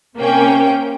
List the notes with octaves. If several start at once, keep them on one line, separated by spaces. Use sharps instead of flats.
C3 A#3 C#4 G5